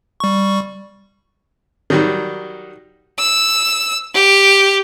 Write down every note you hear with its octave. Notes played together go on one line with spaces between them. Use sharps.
G3 C#6
D#3 F#3 G3
E6
G4